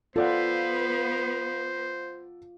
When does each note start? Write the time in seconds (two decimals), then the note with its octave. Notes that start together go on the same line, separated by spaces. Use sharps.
0.16 B3 F4 A4 B4 C5 D5 F#5